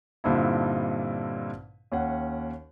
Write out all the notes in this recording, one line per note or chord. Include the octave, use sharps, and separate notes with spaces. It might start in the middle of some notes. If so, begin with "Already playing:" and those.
G2 A#2 D3 C4 D#4 E4
D#2 C#4 F#5